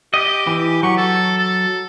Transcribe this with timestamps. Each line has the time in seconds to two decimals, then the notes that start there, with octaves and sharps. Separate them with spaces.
0.14 G4 D#5
0.47 E3
0.83 F#3 C#6
0.97 A4
1.38 A4